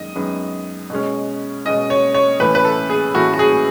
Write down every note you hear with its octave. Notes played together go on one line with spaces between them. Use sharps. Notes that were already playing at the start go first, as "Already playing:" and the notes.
Already playing: F#2 D#3 G#3 D#5
F#2 D#3 G#3 B3
B2 G#3 C#4
B2 G#3 C#4 D#5
C#5
C#5
A2 E3 A3 C#4 B4
B4
A4
G#4
A2 E3 A3 C#4 F#4
F#4
G#4